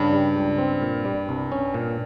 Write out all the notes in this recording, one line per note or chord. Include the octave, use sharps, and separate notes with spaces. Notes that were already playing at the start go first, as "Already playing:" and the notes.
Already playing: G2 C#3
G3
C#2
C4
A#2
G3
C2
C#4
A#2